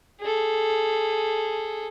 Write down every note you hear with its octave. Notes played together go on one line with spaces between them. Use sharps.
G#4 A4